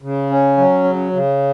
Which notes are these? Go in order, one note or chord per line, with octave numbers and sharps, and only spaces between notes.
C#3
C#4
F#3
C#3
C#3